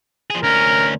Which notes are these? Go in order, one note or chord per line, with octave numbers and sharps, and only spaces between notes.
F3 G#4
D2 C#4 A#4